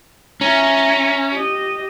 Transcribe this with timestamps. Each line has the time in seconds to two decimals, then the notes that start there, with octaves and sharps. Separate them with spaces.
0.41 C#4 E5 A#5
1.33 G4 D#5